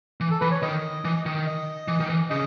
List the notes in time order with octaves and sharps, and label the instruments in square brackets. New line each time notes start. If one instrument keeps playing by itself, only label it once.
[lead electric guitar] E3
[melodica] A4
[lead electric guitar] E3 [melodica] B4
[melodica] C#5
[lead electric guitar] D#3 [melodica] D#5
[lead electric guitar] E3
D#3
[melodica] D#5
[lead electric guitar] E3
D#3
E3
[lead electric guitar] C#3 [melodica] D#5